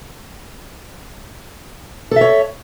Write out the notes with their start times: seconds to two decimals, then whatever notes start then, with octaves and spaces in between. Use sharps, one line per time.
2.11 A4
2.16 E5
2.21 C#5